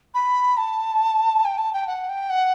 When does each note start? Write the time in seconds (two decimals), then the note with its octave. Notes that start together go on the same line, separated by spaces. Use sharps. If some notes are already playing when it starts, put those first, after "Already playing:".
0.14 B5
0.57 A5
1.45 G5
1.58 A5
1.73 G5
1.87 F#5
2.09 G5
2.30 F#5